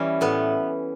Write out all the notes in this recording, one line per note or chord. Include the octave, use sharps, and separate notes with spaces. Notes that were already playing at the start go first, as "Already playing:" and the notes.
Already playing: E3 G3 C#4
A2 B3